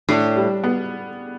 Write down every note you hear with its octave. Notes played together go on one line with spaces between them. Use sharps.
A2 D4
G3
B3